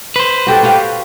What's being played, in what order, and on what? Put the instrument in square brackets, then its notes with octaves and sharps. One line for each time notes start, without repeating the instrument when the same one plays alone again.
[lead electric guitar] B4 C5
[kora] F#4 G4 A4
F#4 G4 F5